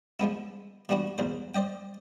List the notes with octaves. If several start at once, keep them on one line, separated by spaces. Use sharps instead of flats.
F3 G#3 B3 E4
E3 G3 B3 D4 F#4
B1 E2 C5
C5 D5 D#5 G5